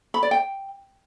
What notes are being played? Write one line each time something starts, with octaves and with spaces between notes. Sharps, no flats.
B5
D5
G5